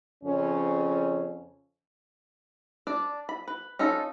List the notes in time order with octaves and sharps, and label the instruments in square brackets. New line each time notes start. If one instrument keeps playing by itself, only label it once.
[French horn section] F2 C#3 C#4
[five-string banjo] D4 D5
B5
B4
C#4 D#4 F4 A4